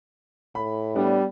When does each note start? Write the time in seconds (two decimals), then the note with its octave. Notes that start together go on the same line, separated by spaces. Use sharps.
0.55 A2 B5
0.96 G3 B3 D4